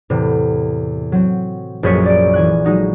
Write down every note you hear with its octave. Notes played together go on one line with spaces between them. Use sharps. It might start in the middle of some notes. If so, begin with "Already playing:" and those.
E2 A2 C3
F#3 C4
A#1 F#2 G#4 C#5 B6 C#7
D5 D7
E3 G#5 F#6
F#3 G#3 D#4 F#4